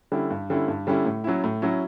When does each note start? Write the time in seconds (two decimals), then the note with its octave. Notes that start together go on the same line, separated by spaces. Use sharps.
0.12 D3 G3 C#4 E4
0.30 G2
0.50 D3 G3 C#4 E4
0.68 G2
0.87 D3 G3 C#4 E4
1.05 A2
1.24 F#3 C#4 E4
1.44 A2
1.62 F#3 C#4 E4